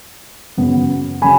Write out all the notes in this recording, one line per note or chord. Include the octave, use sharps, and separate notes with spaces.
F#2 C#3 F#3 B3
C#3 F#3 G#5 B5